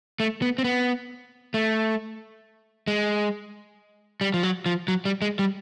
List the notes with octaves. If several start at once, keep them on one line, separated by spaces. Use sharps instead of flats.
A3
B3
C4
B3
A3
G#3
G3
F3
F#3
F3
F#3
G3
G#3
G3